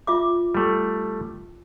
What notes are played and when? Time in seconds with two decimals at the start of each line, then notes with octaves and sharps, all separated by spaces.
0.07 F4 E5 D6
0.55 G3 A3